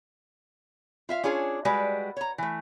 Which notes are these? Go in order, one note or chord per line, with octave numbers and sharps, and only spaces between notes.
F4 E5 F5
C#4 D4 F4 G#4 C#5
G3 G#3 F#4 B4 D5
C#5 A#5
E3 A3